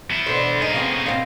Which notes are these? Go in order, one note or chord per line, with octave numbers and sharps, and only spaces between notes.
B3 E4
B2 D3 C5
A#3 D#4 G#4
C#3 B3 C4
B2 C4 F5